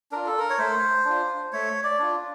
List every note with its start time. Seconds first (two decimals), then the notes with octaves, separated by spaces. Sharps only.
0.12 D4 F4 A#4
0.26 A4
0.39 A#4
0.50 C#5
0.58 A3 C5
1.05 D4 F4
1.53 A3 C#5
1.84 D5
1.99 D4 F4